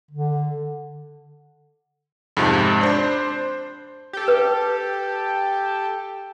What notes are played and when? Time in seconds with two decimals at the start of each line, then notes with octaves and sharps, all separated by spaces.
0.11 D3
2.37 F2 G#2 C3 F3 G#3
2.81 D4 C5
4.13 G4 A4
4.28 B4